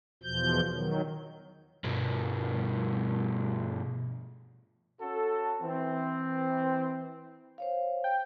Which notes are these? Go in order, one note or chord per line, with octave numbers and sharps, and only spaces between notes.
E2 B2 F3 G6
D#3 F#3
G2 B2
C#4 F#4 A4
E3 C4
C5 C#5 F5
G5